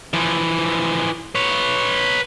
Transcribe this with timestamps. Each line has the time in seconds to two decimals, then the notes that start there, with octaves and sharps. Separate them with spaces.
0.14 E3 F3
1.35 B4 C#5